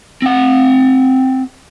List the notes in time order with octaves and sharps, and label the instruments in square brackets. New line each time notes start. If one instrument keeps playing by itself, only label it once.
[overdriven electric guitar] C4 F#5